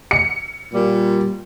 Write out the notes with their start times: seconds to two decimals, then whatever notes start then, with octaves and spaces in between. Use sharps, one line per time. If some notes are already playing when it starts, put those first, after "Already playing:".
0.11 C#7
0.73 A#2 G3